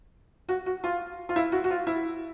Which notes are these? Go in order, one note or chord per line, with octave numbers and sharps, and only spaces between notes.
F#4
F#4
F4
F4
E4
F#4
F#4
F4
E4